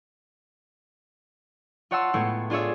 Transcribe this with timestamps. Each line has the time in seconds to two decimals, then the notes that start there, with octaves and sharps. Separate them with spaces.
1.91 F4 C#5 F#5 A5 C6 E6
2.14 A2 G#3 A3 B3 E4 F4
2.50 D4 F4 G#4 C#5 E5